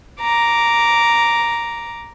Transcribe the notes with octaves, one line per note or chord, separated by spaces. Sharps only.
A#5 D6